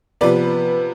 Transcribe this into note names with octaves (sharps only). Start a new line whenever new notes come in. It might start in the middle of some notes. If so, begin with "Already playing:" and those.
C3 F3 B3 B4 D5